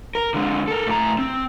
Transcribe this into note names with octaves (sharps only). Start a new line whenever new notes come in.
A#4
D3 G#3
A4 A#4
A2 A#5
C4